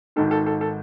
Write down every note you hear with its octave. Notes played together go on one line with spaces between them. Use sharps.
G#1 G#2 D#3 A4
A4
A4
A4